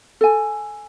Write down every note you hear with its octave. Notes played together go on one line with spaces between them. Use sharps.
A4 G#5